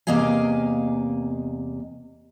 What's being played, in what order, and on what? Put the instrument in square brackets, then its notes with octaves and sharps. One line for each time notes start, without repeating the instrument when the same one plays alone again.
[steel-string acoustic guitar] E2 C3 A#3 D#5 F5 G#5